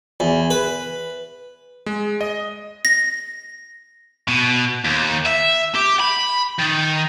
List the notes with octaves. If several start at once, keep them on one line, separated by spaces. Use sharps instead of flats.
E2
B4
G#3
D#5
A#6
B2
D#2
E5
G4
B5
D#3